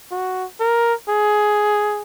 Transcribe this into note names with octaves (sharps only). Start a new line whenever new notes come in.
F#4
A#4
G#4